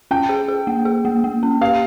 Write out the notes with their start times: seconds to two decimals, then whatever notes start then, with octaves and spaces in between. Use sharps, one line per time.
0.11 C#4 G5
0.29 G#4
0.48 G#4
0.67 A#3
0.85 G#4
1.05 A#3
1.24 A#3
1.43 C#4
1.61 G4 F5